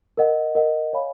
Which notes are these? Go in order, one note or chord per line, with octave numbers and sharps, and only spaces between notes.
A#4 D#5 F#5
A#4 D#5 F#5
C#5 F5 G#5 B5